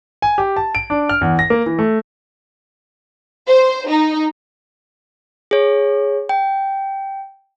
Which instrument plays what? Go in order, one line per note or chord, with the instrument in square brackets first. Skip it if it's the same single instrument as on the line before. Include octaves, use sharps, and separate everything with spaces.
[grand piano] G#5
G4
A5
D7
D4
F6
E2
A#6
A#3
E3
A3
[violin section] C5
D#4
[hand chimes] G#4 C#5
G5